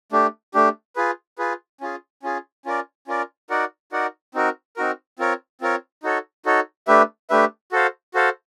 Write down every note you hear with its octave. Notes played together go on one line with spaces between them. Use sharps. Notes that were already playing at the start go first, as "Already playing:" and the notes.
A3 D4 G4
A3 D4 G4
F4 G#4 B4
F4 G#4 B4
C#4 F4 G#4
C#4 F4 G#4
C#4 F4 A#4 D5
C#4 F4 A#4 D5
D#4 F#4 A#4 D5 F#5
D#4 F#4 A#4 D5 F#5
C4 D#4 F#4 A#4
C4 D#4 F#4 A#4
C4 F4 A#4 C#5
C4 F4 A#4 C#5
D#4 F#4 A4 C#5
D#4 F#4 A4 C#5
A3 D4 G4 B4 E5
A3 D4 G4 B4 E5
F#4 A4 C5 F5
F#4 A4 C5 F5